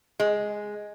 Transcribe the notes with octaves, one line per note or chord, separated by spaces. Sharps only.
G#3